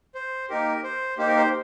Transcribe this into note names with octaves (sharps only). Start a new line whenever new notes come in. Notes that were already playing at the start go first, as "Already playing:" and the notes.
C5
A#3 D#4 G4 A#4
C5
A#3 D#4 G4 C5
A#4
C5